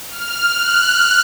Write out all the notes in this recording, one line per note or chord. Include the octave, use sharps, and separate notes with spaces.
F6
F#6